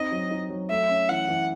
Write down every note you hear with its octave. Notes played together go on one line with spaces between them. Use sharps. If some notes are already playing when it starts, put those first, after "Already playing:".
Already playing: C4 D#4 D#5
F#3
D#4
F#3
A3 E5
C#4
E3 F#5
E3